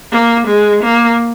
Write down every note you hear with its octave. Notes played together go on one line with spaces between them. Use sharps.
A#3
G#3
A#3